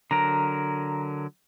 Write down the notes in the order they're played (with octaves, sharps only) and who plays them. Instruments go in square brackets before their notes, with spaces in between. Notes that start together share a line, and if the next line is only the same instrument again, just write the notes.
[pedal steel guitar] D3 F#3 A#4 [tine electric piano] A#5